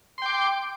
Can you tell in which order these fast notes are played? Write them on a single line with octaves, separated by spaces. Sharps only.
C6 G5 D6